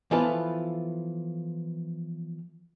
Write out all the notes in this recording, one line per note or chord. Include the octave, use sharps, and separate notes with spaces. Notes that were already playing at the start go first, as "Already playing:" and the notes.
E3 F3 B3 F4 A4 B4